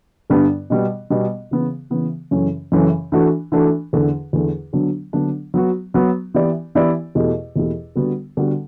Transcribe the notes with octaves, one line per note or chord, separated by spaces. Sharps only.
G2 D3 G3 B3 D4
B2 G3 B3
B2 G3 B3
C#3 E3 B3
C#3 E3 B3
F#2 C#3 E3 A3 C#4
F#2 C#3 E3 A3 C#4
E3 A3 D4 F#4
E3 A3 D4 F#4
E2 D3 A3
E2 D3 A3
D3 F#3 B3 D4
D3 F#3 B3 D4
F#3 B3 F#4
F#3 B3 F#4
E3 B3 E4 G4 D5
E3 B3 E4 G4 D5
E2 B2 A3 E4 G4
E2 B2 A3 E4 G4
D3 G3 B3 F#4
D3 G3 B3 F#4